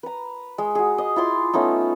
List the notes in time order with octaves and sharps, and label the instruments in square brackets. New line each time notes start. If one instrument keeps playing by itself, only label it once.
[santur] B4 A#5
G#3
F#4 G#4
D#5
E4 F4 C6 D6
A3 B3 C#4 D#4